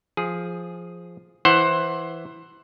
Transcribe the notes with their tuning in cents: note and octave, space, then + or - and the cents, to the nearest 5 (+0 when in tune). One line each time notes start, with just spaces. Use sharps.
F3 +0 G#4 +0
E3 +0 C5 +15 F#5 +0